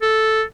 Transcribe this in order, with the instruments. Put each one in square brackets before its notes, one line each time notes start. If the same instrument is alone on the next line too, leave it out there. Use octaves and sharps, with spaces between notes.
[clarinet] A4